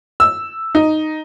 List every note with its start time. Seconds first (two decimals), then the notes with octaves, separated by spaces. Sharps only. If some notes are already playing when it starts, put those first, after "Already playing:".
0.20 E6
0.75 D#4